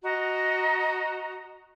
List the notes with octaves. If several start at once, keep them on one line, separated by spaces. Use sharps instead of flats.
F#4 D#5 A#5